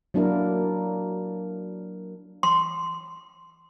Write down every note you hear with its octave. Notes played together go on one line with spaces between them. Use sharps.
F#3 A#3 D4 E4 A#4
C6